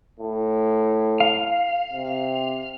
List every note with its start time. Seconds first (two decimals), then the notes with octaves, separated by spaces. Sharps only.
0.20 A2
1.20 F5
1.93 C3